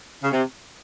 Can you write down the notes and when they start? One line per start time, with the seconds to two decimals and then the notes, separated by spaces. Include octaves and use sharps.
0.24 C#3
0.32 C3